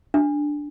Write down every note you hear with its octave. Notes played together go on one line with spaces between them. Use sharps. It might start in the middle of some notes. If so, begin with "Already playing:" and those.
D4